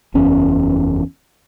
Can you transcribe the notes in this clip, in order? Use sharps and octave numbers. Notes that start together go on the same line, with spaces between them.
F#1 E2 C#4